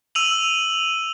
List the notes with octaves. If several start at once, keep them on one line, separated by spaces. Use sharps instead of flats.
E6 D#7 F7 F#7